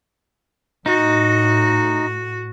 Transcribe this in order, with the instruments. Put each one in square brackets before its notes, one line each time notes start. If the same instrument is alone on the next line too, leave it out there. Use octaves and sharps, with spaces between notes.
[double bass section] A2 [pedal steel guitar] D#4 [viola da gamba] F#4